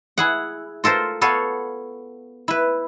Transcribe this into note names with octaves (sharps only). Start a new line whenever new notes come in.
E4 G#4 F#5
F4 A4 A#4 C5
B3 A4 B4 C#5 F5
E4 B4